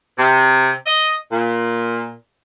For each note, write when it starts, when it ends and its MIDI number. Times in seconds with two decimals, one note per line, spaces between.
0.18 0.72 48
0.86 1.14 75
1.31 2.13 46